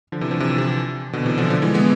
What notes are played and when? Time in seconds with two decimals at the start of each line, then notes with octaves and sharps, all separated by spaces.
0.12 D3 F3
0.21 C3 E3
0.31 D3 F3
0.40 C3 E3
0.58 C3
1.13 B2 D3
1.26 C3 E3
1.38 D3 F3
1.50 D3 F3
1.62 E3 G#3
1.74 G#3 B3